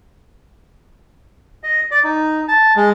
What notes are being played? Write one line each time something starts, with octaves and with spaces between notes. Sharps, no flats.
D#5
D5
D#4
A5
G#3